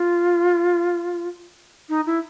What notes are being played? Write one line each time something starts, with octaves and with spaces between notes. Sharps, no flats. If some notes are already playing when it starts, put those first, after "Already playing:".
Already playing: F4
D#4
E4